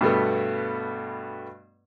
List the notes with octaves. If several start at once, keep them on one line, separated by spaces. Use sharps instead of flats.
G2 B2 A3 B3